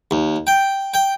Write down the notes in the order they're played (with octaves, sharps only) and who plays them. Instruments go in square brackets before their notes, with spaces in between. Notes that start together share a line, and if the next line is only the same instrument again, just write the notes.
[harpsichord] D#2
G5
G5